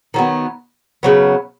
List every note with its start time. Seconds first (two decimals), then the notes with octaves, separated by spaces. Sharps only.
0.14 D#3 F#3 B3
1.03 C#3 F#3 B3